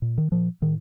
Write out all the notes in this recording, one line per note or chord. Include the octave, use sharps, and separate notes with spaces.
A#2
D#3
A#2 F3
A2 D#3